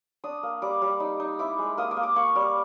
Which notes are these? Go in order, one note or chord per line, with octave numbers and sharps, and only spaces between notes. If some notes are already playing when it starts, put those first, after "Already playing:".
D4 D#6
A#3
G3 D6
G3
D#4
D#4
E4 D6
G#3
A#3 D#6
D6
A#3
D6
A#3 C#6
G3 D6